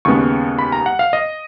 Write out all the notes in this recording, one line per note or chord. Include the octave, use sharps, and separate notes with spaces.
D#2 C#3 G#3 B3 C#6
B5
A#5
F#5
F5
D#5